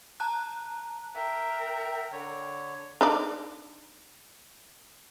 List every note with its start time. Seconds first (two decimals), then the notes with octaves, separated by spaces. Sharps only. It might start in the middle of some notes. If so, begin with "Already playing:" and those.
0.20 A5 A#5 F#6
1.15 A#4 E5 G5
2.12 D3 C#5
3.01 D4 D#4 D5